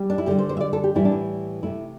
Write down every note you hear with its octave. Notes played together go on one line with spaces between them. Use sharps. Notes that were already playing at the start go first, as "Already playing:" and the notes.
Already playing: G3
D4
E4
D3 G3 G4
C5
C5
E5
D5
A4
G4
A2 E3 G3 E4
D4
E4
C3 A3 E4